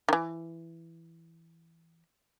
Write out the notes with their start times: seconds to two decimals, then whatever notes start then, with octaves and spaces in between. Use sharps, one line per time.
0.09 D#3 E3